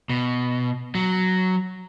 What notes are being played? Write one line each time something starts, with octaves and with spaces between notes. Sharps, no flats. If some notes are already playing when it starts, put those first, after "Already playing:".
B2
F#3